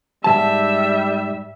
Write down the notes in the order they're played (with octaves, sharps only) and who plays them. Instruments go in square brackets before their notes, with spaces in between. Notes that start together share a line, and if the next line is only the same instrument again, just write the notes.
[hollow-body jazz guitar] G#2 F3 A5 [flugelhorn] G3 [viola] E5